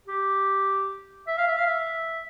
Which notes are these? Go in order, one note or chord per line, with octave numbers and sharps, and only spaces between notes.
G4
E5
F5
E5
F5
E5